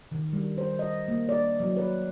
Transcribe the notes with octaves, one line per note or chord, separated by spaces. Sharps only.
D#3
G3
C5
D#5
A#3
D5
F#3
B4